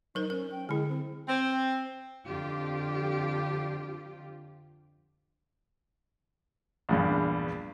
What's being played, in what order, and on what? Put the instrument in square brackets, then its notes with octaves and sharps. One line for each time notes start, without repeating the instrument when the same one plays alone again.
[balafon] F#3 A#4 C5 [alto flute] D#4
[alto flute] C#4 [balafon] A#4
[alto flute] G5
[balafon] D3 E4 [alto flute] G#3
[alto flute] C4
[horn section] C4
[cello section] F2 D3 F4 G4
[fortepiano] A#1 E2 G2